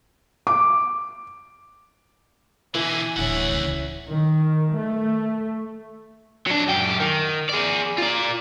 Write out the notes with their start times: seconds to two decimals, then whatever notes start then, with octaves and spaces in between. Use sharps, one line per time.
0.47 D6
2.75 B2 D3 E3 E4 G#5
3.16 D1 A1 D2 C#5 E5 F#5
3.52 C#2 C#3
4.08 D#3
4.76 A3
6.47 F#3 D4
6.68 F#2 G4
7.00 D#3
7.49 G#4 D5
7.98 F4 D5